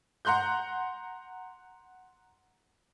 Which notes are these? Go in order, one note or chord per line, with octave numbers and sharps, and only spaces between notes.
F#5 A#5 C6 F#6 G6